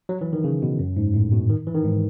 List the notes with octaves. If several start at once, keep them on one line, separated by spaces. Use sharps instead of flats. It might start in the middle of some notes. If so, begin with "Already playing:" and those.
F#3
E3
D#3
C#3
B2
F#2
G#2
A2
B2
D#3
E3
D#3
G#2